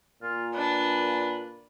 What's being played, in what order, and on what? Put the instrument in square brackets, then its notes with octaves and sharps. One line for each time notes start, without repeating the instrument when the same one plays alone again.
[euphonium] A#2 [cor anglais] F4
[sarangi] D4 [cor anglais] B4